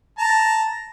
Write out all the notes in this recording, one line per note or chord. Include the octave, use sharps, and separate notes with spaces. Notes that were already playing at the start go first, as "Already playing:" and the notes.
A5 A#5